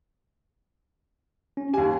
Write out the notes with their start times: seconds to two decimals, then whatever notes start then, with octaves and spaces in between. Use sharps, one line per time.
1.57 C#4
1.74 D#2 G4 G#5